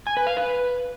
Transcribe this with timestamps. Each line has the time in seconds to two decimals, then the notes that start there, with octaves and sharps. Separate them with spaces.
0.07 G#5
0.17 B4
0.27 F5
0.37 B4